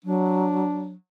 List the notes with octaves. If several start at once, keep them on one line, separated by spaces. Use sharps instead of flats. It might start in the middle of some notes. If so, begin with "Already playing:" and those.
F#3 D4